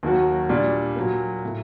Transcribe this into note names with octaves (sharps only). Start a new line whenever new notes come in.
D#2 D#3 F#3 A#3 F#4
A#2 G3 D4
A#2 F#3 A#3
A2 A3